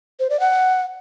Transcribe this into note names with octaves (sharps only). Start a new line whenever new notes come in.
C5
D5
F#5